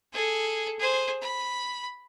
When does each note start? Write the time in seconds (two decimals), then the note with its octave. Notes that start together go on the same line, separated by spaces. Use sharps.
0.13 G#4 A4
0.79 G#4 C5
1.21 B5